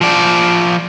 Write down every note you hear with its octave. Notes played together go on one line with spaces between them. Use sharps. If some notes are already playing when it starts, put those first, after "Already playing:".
F3 D5